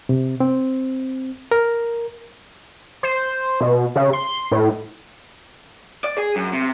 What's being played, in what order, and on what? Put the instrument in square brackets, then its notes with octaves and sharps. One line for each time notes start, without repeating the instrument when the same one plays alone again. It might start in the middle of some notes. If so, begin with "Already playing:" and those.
[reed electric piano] C3
C4
A#4
[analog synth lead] C5
B2
C#3
C6
A2
[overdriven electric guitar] D5
G#4
F#2
C3